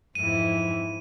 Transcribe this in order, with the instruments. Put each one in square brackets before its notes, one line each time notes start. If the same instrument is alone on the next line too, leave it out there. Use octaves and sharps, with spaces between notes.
[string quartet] F2 G#2 E3 [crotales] D#7